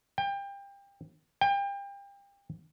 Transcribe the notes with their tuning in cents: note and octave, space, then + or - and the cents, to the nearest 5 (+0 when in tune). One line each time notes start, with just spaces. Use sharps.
G5 +25
G5 +30